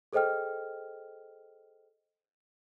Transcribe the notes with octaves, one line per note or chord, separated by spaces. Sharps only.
G#4 A4 C5 D#5 G5 F6